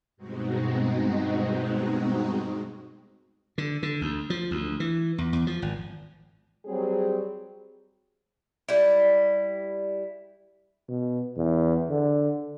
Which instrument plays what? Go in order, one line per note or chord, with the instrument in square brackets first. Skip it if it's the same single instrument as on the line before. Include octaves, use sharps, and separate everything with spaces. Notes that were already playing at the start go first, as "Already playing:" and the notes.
[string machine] G2 B2 G#3 C4 D#4 F#4
[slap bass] D3
D3
D2
F3
D2
E3
E2
E2
F3
G#1
[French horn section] F#3 G3 C4 G#4
[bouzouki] G3 E4
[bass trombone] B2
E2
D3